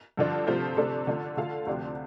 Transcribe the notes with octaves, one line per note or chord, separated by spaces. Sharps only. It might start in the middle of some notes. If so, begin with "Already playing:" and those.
G2 D3 F3 D4 F4
C3 F3 A3 F4 C5
C3 A3 D4 A4
D3 A3 D4 F4
D3 A3 F4 A4 F5
D2 C3 F3 D4 G4